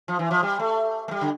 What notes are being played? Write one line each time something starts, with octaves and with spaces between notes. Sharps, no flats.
F3
E3
F3
G3
A3
A3
G3
D3